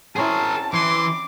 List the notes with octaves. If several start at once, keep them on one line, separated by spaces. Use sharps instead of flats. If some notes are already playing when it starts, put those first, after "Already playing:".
C4 C#4 E4 G#4 A#4 A5
E3 C6 D6